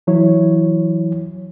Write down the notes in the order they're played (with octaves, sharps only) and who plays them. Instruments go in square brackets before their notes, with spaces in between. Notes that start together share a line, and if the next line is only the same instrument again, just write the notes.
[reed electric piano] E3 F#3 E4 C#5